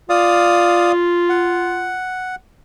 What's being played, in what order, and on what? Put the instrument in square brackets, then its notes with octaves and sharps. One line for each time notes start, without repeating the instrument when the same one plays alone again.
[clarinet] F4 [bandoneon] D5 F5 D#6
[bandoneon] F#5